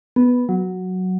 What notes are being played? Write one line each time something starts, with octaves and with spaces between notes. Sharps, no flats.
B3
F#3